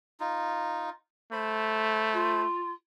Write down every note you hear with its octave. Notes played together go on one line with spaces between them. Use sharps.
D#4 F4
A3 C5 B5
F4